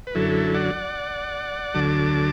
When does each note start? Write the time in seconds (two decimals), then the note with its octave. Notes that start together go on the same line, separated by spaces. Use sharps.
0.07 B4
0.15 F#2 D3 F#3 E4 A4
0.54 D5 F#5
1.74 D2 D3 F#3 A5 D6